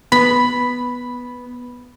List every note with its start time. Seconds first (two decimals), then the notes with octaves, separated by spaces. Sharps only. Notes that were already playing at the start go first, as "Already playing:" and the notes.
0.12 B3 B5